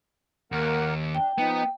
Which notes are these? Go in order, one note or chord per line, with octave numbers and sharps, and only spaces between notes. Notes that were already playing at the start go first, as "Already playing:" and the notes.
D#2 A#3 A#4 F#5
D4 G5
F3 B3 D#4